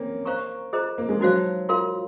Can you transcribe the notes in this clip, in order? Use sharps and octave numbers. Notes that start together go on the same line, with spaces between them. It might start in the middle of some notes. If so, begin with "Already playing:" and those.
Already playing: A#3 C4 C#4
C5 F5 A#5 C#6
F4 G#4 C5 D#5 A#5
A#3
G#3
F#3 D#4 F#4 C5 F5
F4 A#4 F5 C6